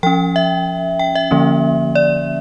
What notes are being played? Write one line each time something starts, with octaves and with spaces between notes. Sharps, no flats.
F3 C#4 G5
E5
G5
E5
D3 F3 A#3 C#4
D5